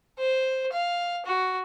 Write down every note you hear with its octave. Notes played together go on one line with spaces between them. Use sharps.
C5
F5
F#4